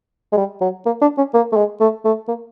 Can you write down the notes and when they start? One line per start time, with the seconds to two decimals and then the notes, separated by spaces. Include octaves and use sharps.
0.33 G#3
0.37 G3
0.61 F#3
0.86 A#3
1.02 D4
1.18 C#4
1.34 A#3
1.52 A3
1.57 G#3
1.80 A3
2.05 A3
2.28 A#3